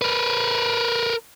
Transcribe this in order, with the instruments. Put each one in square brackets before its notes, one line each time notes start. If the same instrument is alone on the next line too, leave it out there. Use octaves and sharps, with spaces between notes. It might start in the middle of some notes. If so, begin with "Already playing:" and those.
[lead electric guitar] A#4 B4